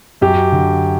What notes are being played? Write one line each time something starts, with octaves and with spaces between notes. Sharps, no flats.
F#2 G4
D3